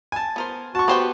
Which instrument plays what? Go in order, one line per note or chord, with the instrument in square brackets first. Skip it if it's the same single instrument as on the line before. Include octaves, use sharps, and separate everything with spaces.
[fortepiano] G#5 A5
[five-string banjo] B3 A#4 C5
[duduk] F#4 [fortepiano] A5 C#6
[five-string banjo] B3 C5 G5 [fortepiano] G4